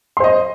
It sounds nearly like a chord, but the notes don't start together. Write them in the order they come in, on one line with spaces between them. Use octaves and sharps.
C6 C5 D#5